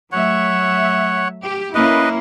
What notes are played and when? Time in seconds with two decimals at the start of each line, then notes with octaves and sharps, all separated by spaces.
0.12 F#3 A3 C#5 E5 F#5
1.42 G4
1.75 A#3 C#4 E4 B4 D#5